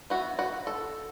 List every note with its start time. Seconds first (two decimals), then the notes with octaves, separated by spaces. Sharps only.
0.10 E3 B3 F#4
0.39 F#4
0.67 A4